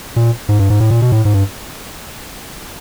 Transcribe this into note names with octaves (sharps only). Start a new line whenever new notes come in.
A#2
G#2
G2
G#2
A2
A#2
B2
A2
G#2
G2